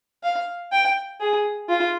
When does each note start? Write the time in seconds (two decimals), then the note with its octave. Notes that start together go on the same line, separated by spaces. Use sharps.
0.23 F5
0.72 G5
1.20 G#4
1.69 F4